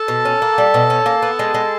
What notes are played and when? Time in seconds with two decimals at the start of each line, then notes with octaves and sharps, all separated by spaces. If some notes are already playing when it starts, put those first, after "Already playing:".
Already playing: A4 A5
0.08 B2
0.25 C#4
0.42 A#3
0.58 G3
0.74 B2
0.90 C#4
1.06 A#3
1.22 B3
1.39 G#3
1.54 G#3